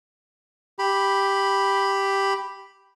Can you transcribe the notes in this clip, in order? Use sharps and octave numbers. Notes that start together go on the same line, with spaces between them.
G4 B5